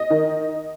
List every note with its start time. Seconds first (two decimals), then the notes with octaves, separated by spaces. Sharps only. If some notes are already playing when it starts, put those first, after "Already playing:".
Already playing: D#5
0.10 D#3